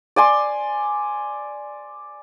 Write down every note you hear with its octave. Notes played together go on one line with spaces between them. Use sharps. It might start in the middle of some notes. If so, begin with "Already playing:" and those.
D5 G#5 C6